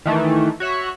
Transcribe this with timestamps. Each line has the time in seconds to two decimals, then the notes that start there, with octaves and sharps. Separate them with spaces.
0.06 D#3 E3 A3
0.60 F#4 C#5 E5 F#6